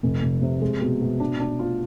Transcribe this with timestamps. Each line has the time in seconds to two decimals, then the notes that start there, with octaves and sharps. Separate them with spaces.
0.03 F1
0.22 F1
0.42 C3
0.61 G#3
0.81 B2
1.01 B2
1.20 D4
1.40 D4
1.59 F4